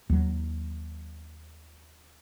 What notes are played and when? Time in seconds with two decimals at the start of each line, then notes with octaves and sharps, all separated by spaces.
0.10 D#2 F#3